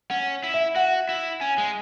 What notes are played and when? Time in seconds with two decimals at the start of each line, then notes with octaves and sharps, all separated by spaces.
0.10 C#4 F#5
0.43 E4
0.54 E5
0.76 F#4 F#5
1.09 E4
1.40 C#4 G#5
1.58 G#3